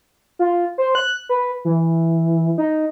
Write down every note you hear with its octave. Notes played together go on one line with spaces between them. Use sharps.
F4
C5
F#6
B4
E3
D#4